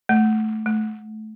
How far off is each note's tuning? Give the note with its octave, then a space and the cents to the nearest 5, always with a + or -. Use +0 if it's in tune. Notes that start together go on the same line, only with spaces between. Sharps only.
A3 -10
A3 -30